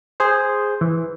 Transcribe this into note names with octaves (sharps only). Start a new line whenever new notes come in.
G#4 C5
E3